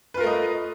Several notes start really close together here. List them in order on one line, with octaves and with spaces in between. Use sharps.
B4 F4 A#4 A3 D#5